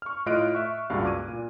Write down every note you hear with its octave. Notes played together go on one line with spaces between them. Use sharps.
C#6 F6
A2 F4 D#5 F6 F#6 D7
E5 C#6
C#2 G2 A#2 F#4 F5
D6 G#6 D#7
A#2